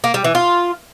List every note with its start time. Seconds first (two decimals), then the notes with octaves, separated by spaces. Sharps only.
0.04 A#3
0.14 G3
0.24 E3
0.35 F4